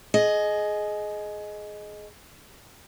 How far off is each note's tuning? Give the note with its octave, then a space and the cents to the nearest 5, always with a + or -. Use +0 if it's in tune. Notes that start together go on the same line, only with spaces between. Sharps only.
G#4 +20 D#5 +0